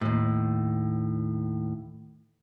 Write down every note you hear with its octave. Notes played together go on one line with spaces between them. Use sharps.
D#2 A2